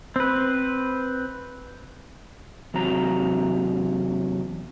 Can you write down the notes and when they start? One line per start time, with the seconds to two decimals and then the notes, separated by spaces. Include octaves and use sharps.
0.16 C4 B4
2.74 E2 C3 F#3 A#5